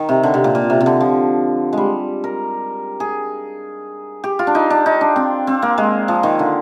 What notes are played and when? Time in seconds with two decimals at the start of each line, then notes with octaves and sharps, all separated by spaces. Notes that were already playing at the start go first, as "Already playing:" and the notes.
Already playing: D#3
0.09 C3
0.23 D3
0.34 C3
0.44 A#2
0.55 A#2
0.70 C3
0.81 C3
0.86 D3
1.01 F3
1.73 G3 G#3
2.24 A#4
3.00 G#4
4.24 G4
4.39 F4
4.47 D4
4.55 D#4
4.70 D4
4.86 D#4
5.01 D4
5.16 C4
5.47 C4
5.62 A#3
5.78 G#3
6.08 F3
6.23 D#3
6.39 D3